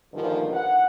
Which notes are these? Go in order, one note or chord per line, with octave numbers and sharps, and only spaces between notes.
E2 G2 A#2 D3 D#3 F3
F#5